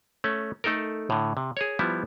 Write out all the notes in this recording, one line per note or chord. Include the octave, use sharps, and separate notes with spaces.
A3 C#4
A3 D#4 A4 A#4
A2 D3
C3
G#4 A#4 C#5
F3 G3 B3 E4